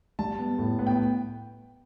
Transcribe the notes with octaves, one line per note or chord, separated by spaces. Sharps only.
G3 A5
B3
A2
B3
G5